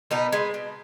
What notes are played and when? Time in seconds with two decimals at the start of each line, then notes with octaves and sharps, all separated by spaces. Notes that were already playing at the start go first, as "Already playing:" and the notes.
0.11 B2 B3 D#4
0.32 G#3 B3
0.54 B2